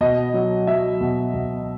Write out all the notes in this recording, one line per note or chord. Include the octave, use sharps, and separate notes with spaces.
B2 D#5
F#3
F#3 E5
B2
B2